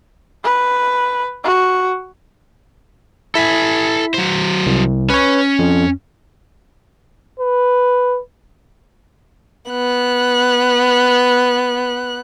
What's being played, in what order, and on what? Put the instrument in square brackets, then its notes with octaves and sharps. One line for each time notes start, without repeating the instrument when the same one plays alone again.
[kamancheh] B4
F#4
[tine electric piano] E4 B6 [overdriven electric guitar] A4 G#5
[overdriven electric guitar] F#3 C5
[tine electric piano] C2
[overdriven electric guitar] C#4 [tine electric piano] B4 C#5
[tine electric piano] F2
[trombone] B4
[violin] B3 F#6